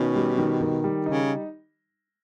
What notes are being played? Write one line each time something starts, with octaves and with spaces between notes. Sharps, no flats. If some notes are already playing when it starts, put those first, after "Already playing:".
Already playing: B2 D#3 C#4
G3
D#3
D#3
G3
C#3 D#4